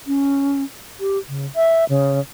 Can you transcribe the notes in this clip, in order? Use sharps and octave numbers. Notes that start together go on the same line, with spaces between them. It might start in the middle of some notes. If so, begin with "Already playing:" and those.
C#4
G4
C#3
E5
C#3